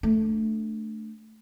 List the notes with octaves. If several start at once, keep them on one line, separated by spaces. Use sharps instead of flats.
A3 D4